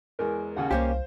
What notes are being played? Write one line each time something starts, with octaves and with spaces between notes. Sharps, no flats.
E2 G#3 A#4
D#2 C#3 F#5
C2 A#3 C#4 G4 C5 F5